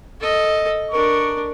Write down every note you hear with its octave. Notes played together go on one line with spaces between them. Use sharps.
A4 D#5
D4 A#4 C#6